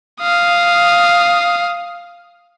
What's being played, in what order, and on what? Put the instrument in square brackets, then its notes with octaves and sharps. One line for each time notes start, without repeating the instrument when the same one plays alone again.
[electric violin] F5 D#6